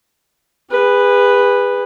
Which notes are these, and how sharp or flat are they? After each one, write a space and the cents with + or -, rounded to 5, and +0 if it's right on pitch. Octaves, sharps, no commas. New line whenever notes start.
G#4 -35 B4 +0